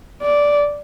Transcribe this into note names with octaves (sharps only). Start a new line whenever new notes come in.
D5